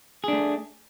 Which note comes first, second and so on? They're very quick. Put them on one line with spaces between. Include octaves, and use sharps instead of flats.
G#4 D4 A3